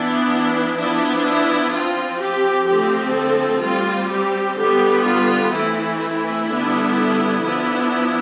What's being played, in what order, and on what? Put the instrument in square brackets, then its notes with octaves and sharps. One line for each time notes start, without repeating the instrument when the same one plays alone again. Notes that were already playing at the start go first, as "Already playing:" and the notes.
Already playing: [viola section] E3 B3 D4 E4
F3 B3 D4 E4
E4
F3 C4 F4
G4
D3 F3 A3 C4 G4
A4
G3 C4 F4
G4
D3 G3 B3 G4
F4
E3 A3 C4 E4
E4
D3 G3 B3 D4
F3 B3 D4 E4